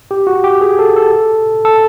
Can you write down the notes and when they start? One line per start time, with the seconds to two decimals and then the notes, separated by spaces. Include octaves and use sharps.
0.11 G4
0.27 F#4
0.44 G4
0.61 G#4
0.79 A4
0.96 A4
1.65 A4